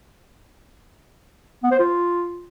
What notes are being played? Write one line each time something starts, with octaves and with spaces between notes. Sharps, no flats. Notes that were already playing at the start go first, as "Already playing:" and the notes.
B3
C5
F4